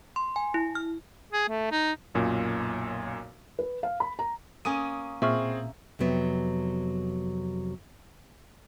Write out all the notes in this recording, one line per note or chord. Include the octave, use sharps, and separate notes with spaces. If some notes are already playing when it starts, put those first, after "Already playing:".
C6
G#5
E4
F6
G#4
A3
D#4
B1 F#2 A#2
B4
F5
B5
A#5
A#3 C#4 D#6 D#7
A#2 C4 G#4 E5 C#6 F6
F2 C3 F#3 B3